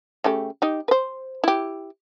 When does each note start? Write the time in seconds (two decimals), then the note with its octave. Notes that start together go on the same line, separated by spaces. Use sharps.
0.24 C#3 A3 G4
0.62 D#4 G4
0.88 B4 C5
1.44 E4 G4